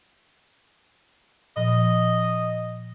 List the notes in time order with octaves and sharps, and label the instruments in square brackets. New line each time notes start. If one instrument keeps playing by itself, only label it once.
[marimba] A#2 F3 [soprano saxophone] D#5